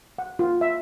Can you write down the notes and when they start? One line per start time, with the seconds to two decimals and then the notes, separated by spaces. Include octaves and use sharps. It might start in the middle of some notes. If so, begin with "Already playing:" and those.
0.18 F#5
0.39 F4
0.61 E5